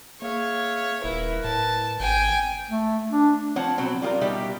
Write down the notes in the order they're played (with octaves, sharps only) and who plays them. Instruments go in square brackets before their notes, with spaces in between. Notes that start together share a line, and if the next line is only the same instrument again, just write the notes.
[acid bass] A#3 [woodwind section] G#4 E5 F5 [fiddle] C#5
[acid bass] D#1 [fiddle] E4 [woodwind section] A#4 B4
[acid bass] A2 [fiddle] A5
[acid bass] G#1 [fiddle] G5 G#5
[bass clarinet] A3
D4
[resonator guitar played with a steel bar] F3 C4 C#5 F#5 A5
B2 F#3 C4
G3 F4 G4 A#4
B2 G3 D#4 G4 E5